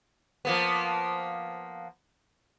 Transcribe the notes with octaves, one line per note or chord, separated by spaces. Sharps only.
F3 A#3 B3